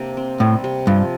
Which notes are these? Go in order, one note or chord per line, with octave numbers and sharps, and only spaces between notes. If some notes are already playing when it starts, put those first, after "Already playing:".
Already playing: C3 A#3 D4
C4
A2 G3
C3
G2 F3